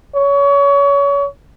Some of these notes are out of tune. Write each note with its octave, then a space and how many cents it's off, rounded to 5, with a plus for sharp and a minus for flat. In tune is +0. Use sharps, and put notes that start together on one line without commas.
C#5 +30